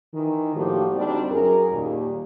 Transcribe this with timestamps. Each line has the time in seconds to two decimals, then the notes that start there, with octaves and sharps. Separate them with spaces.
0.14 D#3 E3
0.56 A2 F3 G3 A#3 F#4 G4
0.95 D2 G3 C4 D4 D#4 D5
1.31 F#2 G#4 A#4
1.72 D#2 A#2 G3